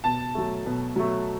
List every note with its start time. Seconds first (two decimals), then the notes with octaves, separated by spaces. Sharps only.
0.04 B2 A5
0.35 F#3 A3
0.66 B2
0.96 F#3 A3